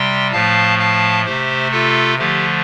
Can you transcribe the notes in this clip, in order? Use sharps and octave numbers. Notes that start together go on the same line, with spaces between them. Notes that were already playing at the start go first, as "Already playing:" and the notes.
Already playing: C3 G3 G5 C6
A2 F3 A3 F5 A5
F5 A5
C3 A3 G4 C5
F4 A4
D3 F3 A3 G4